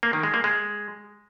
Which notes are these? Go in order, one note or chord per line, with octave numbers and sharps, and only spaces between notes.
A#3
D#3
G#3
A#3
G#3